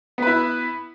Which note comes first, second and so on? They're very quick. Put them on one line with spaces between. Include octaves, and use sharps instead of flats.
B3 B4 E4